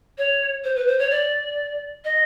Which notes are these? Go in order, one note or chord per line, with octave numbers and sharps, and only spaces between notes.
C#5
C5
B4
C5
C#5
D5
D#5